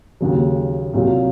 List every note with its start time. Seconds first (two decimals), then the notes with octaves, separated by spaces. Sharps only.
0.21 D#2 C#3 F#3
0.94 C2 A#2 F#3 A#3